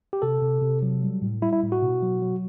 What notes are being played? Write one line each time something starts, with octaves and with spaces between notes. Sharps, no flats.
G4
C3 A4
C3
C3
F#3
G3
A2
G3 E4
E4
A2
F#4
B2
F#3
F#3